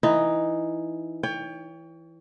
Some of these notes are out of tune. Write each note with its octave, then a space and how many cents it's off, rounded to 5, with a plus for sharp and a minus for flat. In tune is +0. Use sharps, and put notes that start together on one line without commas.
E3 +5 D#4 +0
C#5 +30 G5 +25